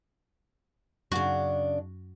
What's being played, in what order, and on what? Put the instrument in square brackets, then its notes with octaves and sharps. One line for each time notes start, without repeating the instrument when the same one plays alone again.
[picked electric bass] F#2 [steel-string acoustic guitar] C#3 D4 [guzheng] F#4